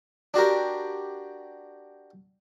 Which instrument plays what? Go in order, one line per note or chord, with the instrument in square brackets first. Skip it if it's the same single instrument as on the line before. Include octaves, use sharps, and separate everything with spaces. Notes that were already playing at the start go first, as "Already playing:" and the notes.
[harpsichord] D4 F#4 G4 A#4